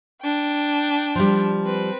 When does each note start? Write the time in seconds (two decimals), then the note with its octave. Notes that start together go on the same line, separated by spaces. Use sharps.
0.23 D4 G5
1.15 F3 G3
1.64 C4 B4